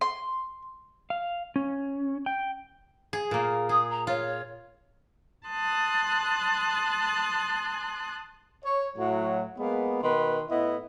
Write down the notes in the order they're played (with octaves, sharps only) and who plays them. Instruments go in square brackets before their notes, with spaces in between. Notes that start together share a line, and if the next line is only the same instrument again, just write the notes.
[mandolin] C6
[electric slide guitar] F5
C#4
G5
[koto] G#4
A#2 A#3
[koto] G#4 [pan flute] D#6
[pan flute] A#5
[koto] F4 [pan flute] C#5
[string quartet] A5 C6 D#6 F#6
[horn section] C#5
A2 F#3
G#3 A#3 B3
B2 D#3 B4 C6
A2 B3 E4 D#5